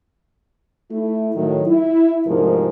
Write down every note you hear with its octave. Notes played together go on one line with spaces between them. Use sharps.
A3 E4
A2 D#3 F#3
E4
D2 G#2 C3 F3 A#4